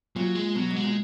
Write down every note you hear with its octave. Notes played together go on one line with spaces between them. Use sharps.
A#2 F#3
G#3
B2 F#3
G#2
G#3
A#2